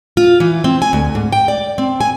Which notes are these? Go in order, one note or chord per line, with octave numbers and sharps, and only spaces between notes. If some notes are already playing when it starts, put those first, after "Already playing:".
F4
E3
C4
G#5
D2
G#2
G5
D5
C4
G#5